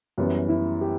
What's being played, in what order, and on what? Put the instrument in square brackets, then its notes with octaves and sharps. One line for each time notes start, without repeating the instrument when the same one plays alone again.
[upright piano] F#2 E3 G3 [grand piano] B3
[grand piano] E4
G4